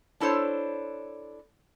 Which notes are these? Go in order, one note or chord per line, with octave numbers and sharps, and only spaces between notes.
D4 E4 A4 C5 C#5